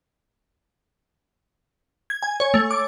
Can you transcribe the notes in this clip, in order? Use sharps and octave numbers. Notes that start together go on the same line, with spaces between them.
G#6
G#5
C#5
A3
D6